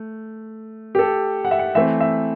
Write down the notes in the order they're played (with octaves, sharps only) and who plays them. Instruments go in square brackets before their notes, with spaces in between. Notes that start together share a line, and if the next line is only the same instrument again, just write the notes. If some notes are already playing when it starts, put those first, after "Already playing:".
Already playing: [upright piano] A3
G4
A4
F#5
E5
F#5
E3 A3 C4 E5
E5